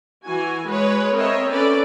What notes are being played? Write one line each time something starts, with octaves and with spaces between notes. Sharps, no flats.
E3 F#4 G#5
G#3 B4 C#5
C4 A#4 C#5 D#5 E5
C#4 A4 B4 D5